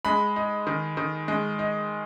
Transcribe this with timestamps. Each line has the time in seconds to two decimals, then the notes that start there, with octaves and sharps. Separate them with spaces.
0.05 G#3 B5
0.36 D#4
0.67 D#3
0.97 D#3
1.28 G#3
1.59 D#4